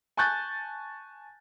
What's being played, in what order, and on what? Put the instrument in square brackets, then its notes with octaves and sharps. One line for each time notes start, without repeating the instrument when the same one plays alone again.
[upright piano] G#5 A5 C#6 F#6 G6 A6